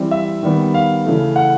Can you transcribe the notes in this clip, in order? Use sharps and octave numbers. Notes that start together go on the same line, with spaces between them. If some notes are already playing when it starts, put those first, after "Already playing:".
Already playing: E3 G3 C4
E5
D#3 G3 B3
F5
C#3 E3 A3
F#5